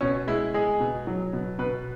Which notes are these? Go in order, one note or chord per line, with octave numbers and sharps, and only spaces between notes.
B2 C#4
G#3 E4
G#3 G#4
B2
F#3
B2
B2 B4